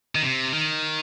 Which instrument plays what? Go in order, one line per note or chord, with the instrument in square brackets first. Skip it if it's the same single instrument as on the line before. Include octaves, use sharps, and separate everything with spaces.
[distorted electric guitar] D#3
C3
D#3